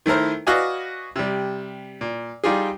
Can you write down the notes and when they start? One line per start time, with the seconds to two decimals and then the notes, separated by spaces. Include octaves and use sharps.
0.06 D#3 A3 E4 A#4 C5
0.47 F#4 B4 D5 D#5 F5 G#5
1.16 C3 G3
2.01 A#2
2.44 G3 D#4 F4 G4 G#4